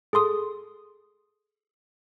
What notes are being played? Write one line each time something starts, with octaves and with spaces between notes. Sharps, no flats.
G#4 A4 C6 D#6